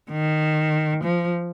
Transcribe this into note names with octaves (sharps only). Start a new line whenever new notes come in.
D#3
F3